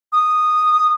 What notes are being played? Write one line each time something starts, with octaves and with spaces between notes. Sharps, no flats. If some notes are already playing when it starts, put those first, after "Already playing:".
D#6